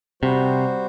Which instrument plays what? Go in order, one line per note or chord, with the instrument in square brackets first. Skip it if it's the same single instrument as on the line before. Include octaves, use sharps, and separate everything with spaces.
[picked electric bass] C3 [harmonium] G3 F#4 C5